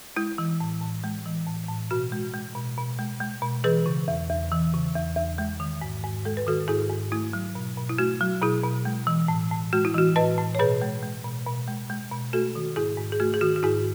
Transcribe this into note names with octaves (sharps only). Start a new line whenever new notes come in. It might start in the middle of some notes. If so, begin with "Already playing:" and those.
G#3 E4
E3
A2
A2
G#3
E3
A2
A2
B2 F#4
G#3
G#3
B2
B2
G#3
G#3
B2
E3 G#4 B4
C#3
E2
E2
E3
C#3
E2
E2
G#3
D#3
G#2
G#2
G#3 A4
B4
D#3 F#4 A4
G#2 E4 G#4
G#2
A3 E4
F#3
B2
B2
E4
A3 F#4
F#3
B2 E4 G#4
B2
G#3
E3
A2
A2
G#3 F#4
E4
E3 F#4
A2 B4 D#5
A2
C#5
B2 G#4 B4
G#3
G#3
B2
B2
G#3
G#3
B2
A3 F#4 A4
D#3
G#2 E4 G#4
G#2
G#4
A3 F#4
G#4
D#3 F#4
F#4
G#2 E4 G#4